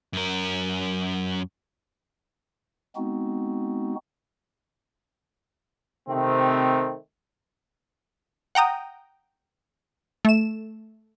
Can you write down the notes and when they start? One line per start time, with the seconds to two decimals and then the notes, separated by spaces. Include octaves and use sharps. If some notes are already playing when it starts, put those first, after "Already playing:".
0.13 F#2 A#4
2.96 G#3 B3 C4 D#4 F#4
6.09 C3 D#3 A3 C4
8.55 F#5 G5 A#5 D#6
10.25 A3 E7